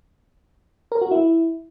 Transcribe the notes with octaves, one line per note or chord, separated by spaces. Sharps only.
A#4
F#4
E4